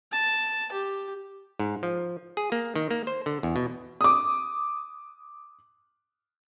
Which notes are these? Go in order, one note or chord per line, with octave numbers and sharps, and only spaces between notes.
A5
G4
G#2
F3
G#4
A#3
D#3
A#3
C5
D3
E2
B2
D6 D#6